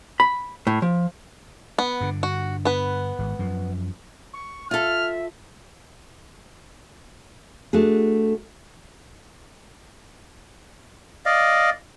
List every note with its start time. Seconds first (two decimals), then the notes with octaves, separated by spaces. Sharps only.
0.20 B5
0.67 A2
0.82 F3
1.78 B3
2.01 G2 D3
2.23 F#4
2.65 B3 B4
3.19 G#1
3.39 F#2 F3
4.33 C#6
4.71 F4 A4 E5 F6
7.73 A3 D4 F#4 G#4
11.26 D5 D#5 F5